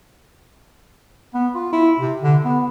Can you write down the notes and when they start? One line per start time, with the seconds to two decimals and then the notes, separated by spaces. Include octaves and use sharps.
1.34 B3
1.55 F4
1.72 E4
2.00 C3
2.22 D3
2.45 B3